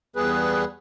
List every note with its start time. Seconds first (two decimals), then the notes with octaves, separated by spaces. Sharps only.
0.16 E2 G3 B3 G#4 B4